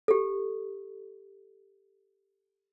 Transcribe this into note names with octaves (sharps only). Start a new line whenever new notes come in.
G4 A4